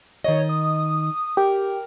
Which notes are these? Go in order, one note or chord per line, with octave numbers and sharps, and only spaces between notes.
D#3 C#5 D#5
D#6
G4 A#4